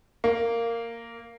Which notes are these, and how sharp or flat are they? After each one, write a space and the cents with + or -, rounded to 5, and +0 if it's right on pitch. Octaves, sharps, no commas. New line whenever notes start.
A#3 -10